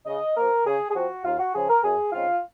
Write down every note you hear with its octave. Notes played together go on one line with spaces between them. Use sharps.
C#3 D#5
F3 A#3 A#4
C#3 G#4
G#4
F3 C4 F#4
D#2 F4
F#4
C#3 F3 G#4
A#4
F#2 G#4
C#3 G#3 C4 D#4 F4